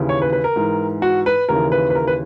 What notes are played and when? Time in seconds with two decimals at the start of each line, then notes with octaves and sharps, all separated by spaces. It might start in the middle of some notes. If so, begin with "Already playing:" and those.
Already playing: D#2 C#3 E3
0.09 C#5
0.22 B4
0.33 B4
0.44 A#4
0.56 G#2 E3
1.02 F#4
1.26 B4
1.49 D#2 C#3 E3 A#4
1.72 B4
1.90 B4
1.95 A#4
2.07 B4